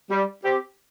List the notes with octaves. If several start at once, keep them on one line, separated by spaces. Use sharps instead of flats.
G3
C4 G4